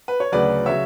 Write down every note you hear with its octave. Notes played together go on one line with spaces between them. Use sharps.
B4
C#5
D2 C#3 F#3 B4 D5
C#3 F#3 C#5 E5